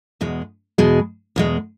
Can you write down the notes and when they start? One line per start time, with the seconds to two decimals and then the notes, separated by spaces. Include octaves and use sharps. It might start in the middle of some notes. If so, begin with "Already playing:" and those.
0.21 E2 B2 G#3
0.78 E2 B2 G#3
1.36 E2 B2 G#3